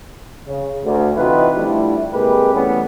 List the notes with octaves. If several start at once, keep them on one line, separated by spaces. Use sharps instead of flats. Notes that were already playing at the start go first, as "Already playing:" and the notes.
C#3
D2
C3 E3 D#4 F4 F#4 B4
F3 G3 A3 D4 E4
C3 G#3 A#3 G4 B4
E3 G3 A3 B3 C#4